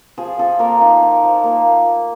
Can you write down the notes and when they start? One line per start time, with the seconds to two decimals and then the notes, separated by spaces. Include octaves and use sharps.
0.18 F3 G#4
0.39 F3 A4
0.59 A#3 A#4
0.81 D#4
1.02 F3
1.23 F3
1.43 A#3